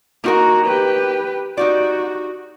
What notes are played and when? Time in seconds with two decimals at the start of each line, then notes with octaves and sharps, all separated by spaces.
0.24 A#3 D#4 F#4 A#4
0.65 G4 B4
1.57 D#4 F#4 G4 D5